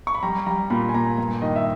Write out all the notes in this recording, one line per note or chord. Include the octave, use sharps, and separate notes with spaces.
C#6
B5
G3 A#5
G3 A#5
A#2 B5
G#5
A#2 A#5
G2
D#3 D#5
E5